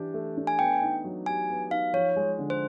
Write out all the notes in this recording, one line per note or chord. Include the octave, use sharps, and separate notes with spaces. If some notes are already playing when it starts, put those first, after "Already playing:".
Already playing: E3 D4 G4
A3
D4
G#5
B3 G5
D#4
F#3
G4 G#5
B3
D#4 F5
F3 C#5
G#3
D3
C5